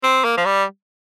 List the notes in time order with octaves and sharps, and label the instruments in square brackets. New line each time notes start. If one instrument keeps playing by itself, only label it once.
[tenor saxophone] C4
A#3
F3
G3